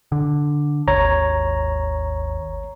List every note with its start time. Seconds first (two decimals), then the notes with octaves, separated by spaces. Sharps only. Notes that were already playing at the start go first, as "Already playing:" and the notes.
0.12 D3
0.88 G#1 D#2 C#5 A#5